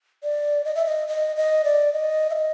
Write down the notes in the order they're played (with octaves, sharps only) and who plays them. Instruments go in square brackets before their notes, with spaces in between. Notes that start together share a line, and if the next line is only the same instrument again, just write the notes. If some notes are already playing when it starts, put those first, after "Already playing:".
[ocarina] D5
D#5
E5
D#5
D#5
D#5
D5
D#5
E5
D#5